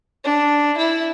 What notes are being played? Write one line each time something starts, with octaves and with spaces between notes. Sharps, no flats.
D4
E4